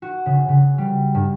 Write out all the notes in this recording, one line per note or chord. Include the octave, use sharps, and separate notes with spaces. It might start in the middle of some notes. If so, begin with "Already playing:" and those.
F#4
C#3
C#3
G3
G2